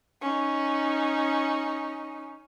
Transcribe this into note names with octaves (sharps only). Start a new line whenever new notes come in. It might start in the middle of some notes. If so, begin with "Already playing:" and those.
C#4 D#4